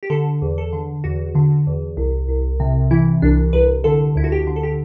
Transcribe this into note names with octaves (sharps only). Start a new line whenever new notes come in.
G4
D3 A4
E2
A4
D3
E2 F#4
D3
E2
C2
C2
C3
E3 E4
C2 D4
C2 B4
D3 A4
D2 E4
F#4
G4
D3
A4
G4